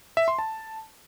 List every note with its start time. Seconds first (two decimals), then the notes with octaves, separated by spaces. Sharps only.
0.17 E5
0.28 C6
0.39 A5